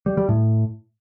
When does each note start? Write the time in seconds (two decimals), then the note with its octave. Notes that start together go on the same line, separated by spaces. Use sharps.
0.06 G3
0.17 G3
0.29 A2